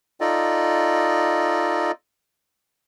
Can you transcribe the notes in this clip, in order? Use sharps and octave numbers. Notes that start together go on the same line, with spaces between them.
D#4 F4 A4 D5 D#5